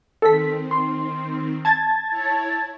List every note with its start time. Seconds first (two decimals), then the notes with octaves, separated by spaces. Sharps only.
0.22 D#3 C4 A4 B6
0.71 C6
1.65 A5 G#6 A6
2.10 E4 C#5